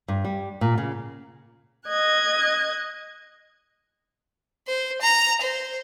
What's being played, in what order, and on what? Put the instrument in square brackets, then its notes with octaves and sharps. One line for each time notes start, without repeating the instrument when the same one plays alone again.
[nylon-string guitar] G2
G3
A#2
C#3
[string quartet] D#5 F#6 G#6
[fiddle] C5
A#5
C5